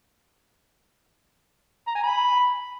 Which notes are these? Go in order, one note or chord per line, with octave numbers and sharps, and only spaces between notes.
A#5
G#5
B5